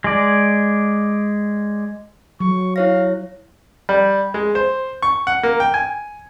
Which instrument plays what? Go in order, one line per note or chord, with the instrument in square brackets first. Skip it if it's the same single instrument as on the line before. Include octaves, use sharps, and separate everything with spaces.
[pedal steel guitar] G#3 D5
[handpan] F#3 [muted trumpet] C#6
[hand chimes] E4 C#5 A#6 [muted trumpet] F5
[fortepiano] G3
G#3
C5
C#6
F#5
A#3
G5
G#5